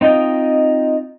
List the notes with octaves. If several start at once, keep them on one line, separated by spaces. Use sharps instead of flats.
C4 D#4 F4 D#5 G5